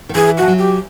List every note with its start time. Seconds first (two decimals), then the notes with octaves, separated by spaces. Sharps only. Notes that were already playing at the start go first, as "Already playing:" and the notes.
0.09 D#3
0.15 E3 G#4
0.38 F3 F#4
0.48 F#3
0.58 G4